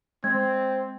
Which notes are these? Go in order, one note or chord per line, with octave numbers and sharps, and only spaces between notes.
G#3 C4 G#6